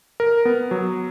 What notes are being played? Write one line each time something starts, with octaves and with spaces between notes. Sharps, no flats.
A#4
B3
F#3